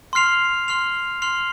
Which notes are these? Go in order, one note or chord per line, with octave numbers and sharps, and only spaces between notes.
C6 F6 C7 F7
C6 F6 C7 F7
C6 F6 C7 F7